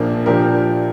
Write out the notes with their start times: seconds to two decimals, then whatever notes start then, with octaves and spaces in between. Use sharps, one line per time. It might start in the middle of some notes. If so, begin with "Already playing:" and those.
Already playing: A#1 A#2 F3 A#3 D4
0.26 A#2 F3 D4 G4 A#4